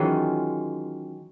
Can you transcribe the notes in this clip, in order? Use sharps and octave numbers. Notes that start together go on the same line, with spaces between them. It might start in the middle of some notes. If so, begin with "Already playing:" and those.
Already playing: D#3 E3 F#3 G#3 C#4 F4